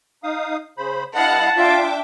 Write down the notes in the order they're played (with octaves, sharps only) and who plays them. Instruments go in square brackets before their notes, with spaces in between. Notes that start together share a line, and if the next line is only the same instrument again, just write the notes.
[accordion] D#4 F5 D#6
C#3 C5 B5
[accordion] G2 E4 D#5 [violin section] F5 F#5 [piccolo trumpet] A5
[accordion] D4 [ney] F4 [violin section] E5 G5 D6